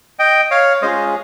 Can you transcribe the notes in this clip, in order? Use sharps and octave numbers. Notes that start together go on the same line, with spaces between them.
D#5 G5
C#5 F5
G#3 C#4 F4 G#4 C5 D#5